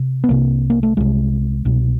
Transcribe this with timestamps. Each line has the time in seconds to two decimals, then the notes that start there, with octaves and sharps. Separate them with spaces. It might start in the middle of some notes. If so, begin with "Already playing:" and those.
Already playing: C3
0.24 B3
0.29 C2 C3 A#3
0.70 A#3
0.83 A3
0.97 C2 C3 G#3
1.65 C2 B2